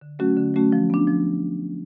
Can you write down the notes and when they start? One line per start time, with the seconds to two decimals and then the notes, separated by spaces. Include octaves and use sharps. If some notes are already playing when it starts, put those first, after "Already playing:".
0.01 D3
0.19 F#3 A3 C#4 F#4
0.37 D3
0.54 F#3 A3 C#4 F#4
0.72 F3
0.90 B3 D4
1.07 F3